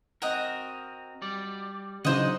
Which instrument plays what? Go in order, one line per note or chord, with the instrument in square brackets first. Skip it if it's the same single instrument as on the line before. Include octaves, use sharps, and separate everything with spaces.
[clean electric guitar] C4 A#4 [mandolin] F#4 D#5
[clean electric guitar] G3 D5
[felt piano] C#3 D#4 [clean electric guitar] F#3 D4 F#5 [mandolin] C5 D#5